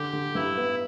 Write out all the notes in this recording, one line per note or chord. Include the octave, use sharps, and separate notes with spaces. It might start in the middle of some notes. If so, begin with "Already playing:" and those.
Already playing: D3 G4
D3
G2 E4
B3